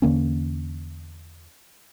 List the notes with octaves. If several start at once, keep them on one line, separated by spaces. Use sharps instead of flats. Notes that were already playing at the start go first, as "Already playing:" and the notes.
E2 D3 A#3 C#4